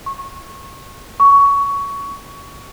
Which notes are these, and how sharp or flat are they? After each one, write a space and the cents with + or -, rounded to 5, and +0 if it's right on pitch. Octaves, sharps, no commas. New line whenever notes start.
C#6 -25
C#6 +15